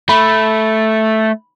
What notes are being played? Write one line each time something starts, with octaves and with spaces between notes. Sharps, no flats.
A3 B5